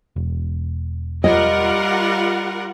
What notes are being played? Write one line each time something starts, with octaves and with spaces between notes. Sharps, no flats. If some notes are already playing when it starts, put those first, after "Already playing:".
E1
G3 F4 A#4 D#5 F#5